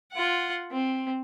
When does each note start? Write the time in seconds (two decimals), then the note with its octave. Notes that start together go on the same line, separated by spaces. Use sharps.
0.13 F4 F#5
0.71 C4